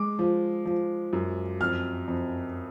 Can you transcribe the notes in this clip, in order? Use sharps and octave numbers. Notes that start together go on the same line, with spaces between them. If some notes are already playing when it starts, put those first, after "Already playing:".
Already playing: G#3 D6
F3
F3
F#2
F2 F6
F2